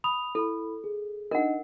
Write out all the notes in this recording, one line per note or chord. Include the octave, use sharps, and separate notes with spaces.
B5 D#6 F7
E4 A4 B5
G#4
D4 D#4 A#4 D#5 F#5